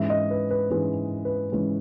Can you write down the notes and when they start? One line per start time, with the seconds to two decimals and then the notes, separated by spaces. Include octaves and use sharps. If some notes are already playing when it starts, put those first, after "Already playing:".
Already playing: G#2 E3 G#3 C#4 E5
0.10 D#5
0.31 B4
0.51 B4
0.70 G#2 E3 G#3 C#4 B4
1.25 B4
1.52 G#2 E3 G#3 C#4